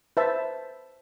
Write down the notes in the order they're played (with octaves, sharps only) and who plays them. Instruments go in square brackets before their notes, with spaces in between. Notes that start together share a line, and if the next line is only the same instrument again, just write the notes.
[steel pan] B4 C5 E5 A5